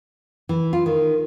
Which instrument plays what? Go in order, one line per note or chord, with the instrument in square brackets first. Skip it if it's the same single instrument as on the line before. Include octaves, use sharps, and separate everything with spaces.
[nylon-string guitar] E3
F4
D#3